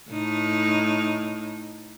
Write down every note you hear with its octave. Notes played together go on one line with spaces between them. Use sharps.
A2 D#4